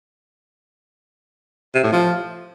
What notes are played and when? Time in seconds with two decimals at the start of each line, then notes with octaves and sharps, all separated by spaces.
1.74 C3
1.83 A2
1.92 F3